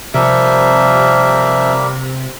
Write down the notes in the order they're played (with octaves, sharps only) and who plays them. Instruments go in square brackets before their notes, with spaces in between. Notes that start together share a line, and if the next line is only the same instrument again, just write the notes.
[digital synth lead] C3 [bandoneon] F3 E5 [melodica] G3 A#3 A#4